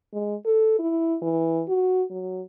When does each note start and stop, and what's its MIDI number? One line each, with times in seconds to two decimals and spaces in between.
0.13 0.36 56
0.45 0.76 69
0.79 1.17 64
1.22 1.63 52
1.68 2.03 66
2.10 2.42 54